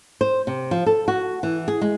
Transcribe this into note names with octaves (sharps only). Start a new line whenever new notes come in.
C5
C3
F3
A4
F#4
E3
G#4
G#3